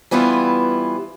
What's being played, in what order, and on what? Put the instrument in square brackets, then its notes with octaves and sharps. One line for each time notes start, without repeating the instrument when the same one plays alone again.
[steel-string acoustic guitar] E3 G3 B3 E4 F4